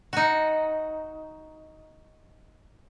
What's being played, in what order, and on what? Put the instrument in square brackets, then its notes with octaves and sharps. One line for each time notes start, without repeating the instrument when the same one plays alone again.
[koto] D#4 F#4